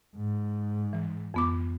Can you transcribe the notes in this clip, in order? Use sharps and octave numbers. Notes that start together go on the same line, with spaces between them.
G#2
E3
F2 B3 D6